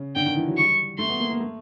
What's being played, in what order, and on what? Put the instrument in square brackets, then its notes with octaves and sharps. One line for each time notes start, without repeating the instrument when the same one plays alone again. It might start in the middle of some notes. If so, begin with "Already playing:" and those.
Already playing: [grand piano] C#3
[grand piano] D3 [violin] G5
[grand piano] D#3
E3
F#3
[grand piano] G3 [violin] C#6
[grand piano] A3 [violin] C6
[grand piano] B3
A#3
A#3
A3